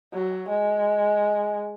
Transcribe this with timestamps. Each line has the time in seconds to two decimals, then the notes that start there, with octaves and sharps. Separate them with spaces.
0.13 F#3
0.49 G#3